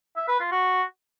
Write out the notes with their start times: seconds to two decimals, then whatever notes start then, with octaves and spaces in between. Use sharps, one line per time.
0.16 E5
0.28 B4
0.40 F4
0.52 F#4